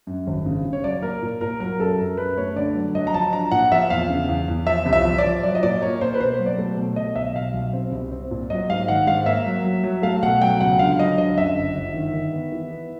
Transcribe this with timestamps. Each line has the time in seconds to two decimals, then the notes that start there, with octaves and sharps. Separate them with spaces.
0.07 F#2
0.27 G#1
0.46 C#3
0.65 C#3
0.73 C#5
0.84 F#3 D5
1.02 A#3 A#4
1.22 A#2
1.41 A#2 A#4
1.60 F#3 A#4
1.79 F#2 A4
1.98 F#2 A#4
2.17 F#2 B4
2.38 A3 C#5
2.56 D3 D5
2.75 F#3
2.95 F#3 D#5
3.07 A#5
3.14 F3 A5
3.33 D4 A#5
3.51 A#2 F#5
3.72 F3 E5
3.90 E2 F5
4.10 C#3
4.29 E2
4.48 E2
4.67 F3 E5
4.86 C2
4.93 E5
5.05 F3
5.18 D5
5.24 F3
5.43 F#3 D5
5.55 D#5
5.63 A#2 D5
5.81 A#3 C#5
6.01 A#3 C5
6.14 B4
6.20 B2 C5
6.39 F#3
6.46 D5
6.59 A3
6.77 B2
6.96 B2 D#5
7.15 B1 E5
7.35 B2 F5
7.54 B1
7.73 C4
7.92 C2
8.12 C4
8.31 A#2
8.50 F#3 D#5
8.70 G#2 F5
8.88 D#3 F#5
9.07 G#2 F5
9.26 A#3 E5
9.46 F#3
9.64 F#3
9.84 F#3
10.03 A3 F5
10.23 B2 F#5
10.42 F#3 G5
10.60 C#2 F#5
10.79 D3 F5
10.98 F#3 D#5
11.18 D3 D#5
11.38 F#2 E5
11.57 G1
11.75 G1
11.94 D#3
12.14 D#3
12.33 B3
12.52 E3
12.71 B3